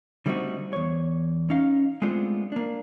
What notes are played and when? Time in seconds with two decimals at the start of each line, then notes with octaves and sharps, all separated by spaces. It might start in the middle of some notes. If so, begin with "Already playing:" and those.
0.26 D3 G3 A3 C4 D#4 F#4
0.73 E2 C#5
1.50 C#4 D#4 F5
2.02 G#3 A3 B3 C4 D4 F4
2.52 A#3 D4